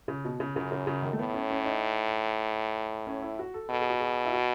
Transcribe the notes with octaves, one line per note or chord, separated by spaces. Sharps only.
C#3
B2
C#3
F#2 C#3
C#3
C#3
D#3
A3
A2 B3
C#4
C#4
D#4
C#4
E4
F#4
A4
B2 A4
G#4
F#4
G#4
E4
F#4